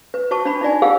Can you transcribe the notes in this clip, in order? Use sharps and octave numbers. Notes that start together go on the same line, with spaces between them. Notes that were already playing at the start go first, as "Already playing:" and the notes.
B4
F#4 C5 A5 C#6
D4 F#4 C5 B5
D#4 F4 D5 G#5
G4 G#4 A#4 C5 F5 F#5